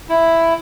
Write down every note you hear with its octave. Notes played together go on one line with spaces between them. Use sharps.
E4